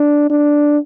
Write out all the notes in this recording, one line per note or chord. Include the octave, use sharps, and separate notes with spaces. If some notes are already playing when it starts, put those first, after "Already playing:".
Already playing: D4
D4